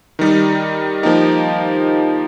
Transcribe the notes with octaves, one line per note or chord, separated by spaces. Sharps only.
D#3 G3 D#4
F3 A#3 D#4 G4